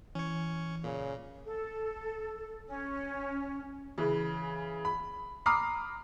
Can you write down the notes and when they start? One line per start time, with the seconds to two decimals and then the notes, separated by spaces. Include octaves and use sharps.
0.15 E3 C#4 C#5
0.84 A#2 C#3
1.46 A4
2.67 C#4
3.98 C#3 E3
4.85 B5
5.46 A#5 B5 D6 D#6 F6 C7